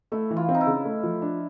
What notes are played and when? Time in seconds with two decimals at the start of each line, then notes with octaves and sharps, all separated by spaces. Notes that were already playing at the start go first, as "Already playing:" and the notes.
0.12 A3 E4
0.31 E3
0.37 F4
0.49 C4
0.55 D#4
0.61 E4
0.67 C#3
0.85 A3
1.03 F3
1.22 D4